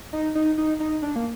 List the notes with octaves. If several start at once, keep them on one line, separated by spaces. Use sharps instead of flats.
D#4
D#4
D#4
D#4
D4
A#3